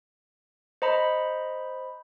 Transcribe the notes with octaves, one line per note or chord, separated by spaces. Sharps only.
C5 D#5 A#5 B5